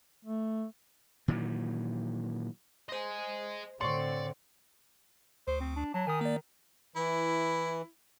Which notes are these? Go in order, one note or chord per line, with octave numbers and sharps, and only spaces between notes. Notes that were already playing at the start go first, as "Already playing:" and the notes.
A3
A#2 D#3 E3 F#3
C5 D#5 G#5 C6
A2 D3 C4 C#5 D5 C6 C#6 C#7
D2 C5
C4
D4
F#3 A5
D#3 G#5 D#6
A#3 D5
E3 E4